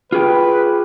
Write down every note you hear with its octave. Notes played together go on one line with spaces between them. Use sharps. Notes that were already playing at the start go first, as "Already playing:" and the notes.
F4 G#4 B4 G5